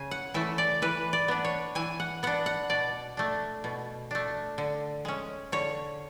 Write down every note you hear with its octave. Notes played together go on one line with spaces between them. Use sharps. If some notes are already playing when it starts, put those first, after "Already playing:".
Already playing: C#3 G#5
F#5
E3 A3 E5
D5
E3 B4
D5
B3 D4
C#5
E3 G#5
F#5
B3 D4 F#5
F#5
B2 D5
A3 D4
B2
A3 D4
D3
G#3 C#4
D3 C#5